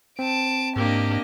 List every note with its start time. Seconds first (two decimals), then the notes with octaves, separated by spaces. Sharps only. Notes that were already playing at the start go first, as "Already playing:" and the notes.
0.19 C4 A5 D7
0.76 G#2 A#3 D4 G4 D#5